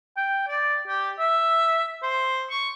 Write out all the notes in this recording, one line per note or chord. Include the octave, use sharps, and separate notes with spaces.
G5
D5
G4
E5
C5
C#6